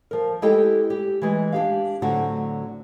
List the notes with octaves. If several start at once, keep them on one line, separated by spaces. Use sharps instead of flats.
F3 A#4
G#3 E4 G4 A4 D#5 G5
G4
E3 G#3
D4 G4 F5
A2 D3 F#3 A3 C4 F#4